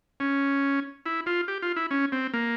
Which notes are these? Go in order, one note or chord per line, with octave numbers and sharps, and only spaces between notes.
C#4
E4
F4
G4
F4
E4
C#4
C4
A#3